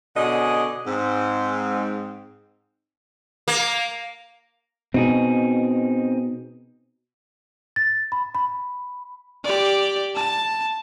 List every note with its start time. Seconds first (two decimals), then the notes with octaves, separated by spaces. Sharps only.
0.17 B2 D3 C#4 G#4 D5 D#5
0.86 G#2 C4
3.48 A#3
4.94 B2 C4 D#4 G#4
7.76 A6
8.12 B5
8.35 B5
9.45 G4 D5
10.15 A5